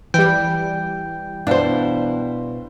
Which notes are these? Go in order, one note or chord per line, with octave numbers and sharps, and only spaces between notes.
E3 G3 G5
B2 D4 E4 C5 F5